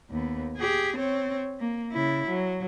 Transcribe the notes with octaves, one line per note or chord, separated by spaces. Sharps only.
D#2 B3
G4 G#4
C4 C#5
A#3
C#3 E4
F#3